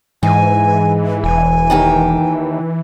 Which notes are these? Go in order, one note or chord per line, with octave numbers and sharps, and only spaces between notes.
G#2 E3 G#3 G#5
E1 G#5
D#2 D#3 G4